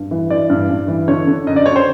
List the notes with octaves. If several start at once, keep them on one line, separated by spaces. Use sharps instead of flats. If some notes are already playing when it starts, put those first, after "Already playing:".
Already playing: G2
E3
E3 D5
G2
G2
E3
D3 C#5
D3
F#2 D#5
D5
D3 C#5
C5